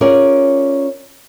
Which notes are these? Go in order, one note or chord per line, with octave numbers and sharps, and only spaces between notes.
C#4 F4 G#4 A#4 D5